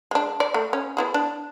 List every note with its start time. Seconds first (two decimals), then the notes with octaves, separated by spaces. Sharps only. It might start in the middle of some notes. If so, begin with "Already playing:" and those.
0.11 G#3 D4
0.40 D5
0.54 A3
0.73 C#4
0.97 B3 E4 G#4
1.14 D4